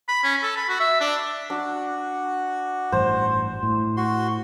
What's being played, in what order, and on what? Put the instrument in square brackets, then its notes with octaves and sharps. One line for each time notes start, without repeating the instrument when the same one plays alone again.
[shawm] B5
C#4
A4
B5
F#4
E5
D4
[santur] D4 [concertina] F#4
[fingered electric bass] A1 G2 [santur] C5
[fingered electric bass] A2
[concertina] F#4 C6